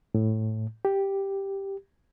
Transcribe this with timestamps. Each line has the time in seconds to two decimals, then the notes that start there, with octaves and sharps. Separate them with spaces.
0.15 A2
0.85 G4